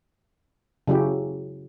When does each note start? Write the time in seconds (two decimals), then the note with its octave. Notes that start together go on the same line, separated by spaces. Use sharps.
0.87 C#3 F#3 E4 G4